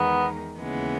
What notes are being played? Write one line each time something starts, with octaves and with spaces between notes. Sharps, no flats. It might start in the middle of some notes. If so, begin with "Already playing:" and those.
Already playing: E2 D#3 G#3 B3 D#4 A#4
D#2 C#3 E3 G#3 B3